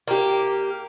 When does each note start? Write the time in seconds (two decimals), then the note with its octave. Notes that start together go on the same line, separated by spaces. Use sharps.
0.08 A#3 G4